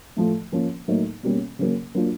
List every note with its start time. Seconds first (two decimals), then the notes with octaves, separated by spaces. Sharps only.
0.17 A2 F3 A3
0.52 F3 A#3 C#4
0.88 A2 F#3 A#3 D#4
1.23 B2 G3 A#3 C#4
1.59 C#3 F#3 A#3
1.95 F#3 A#3 D4 F4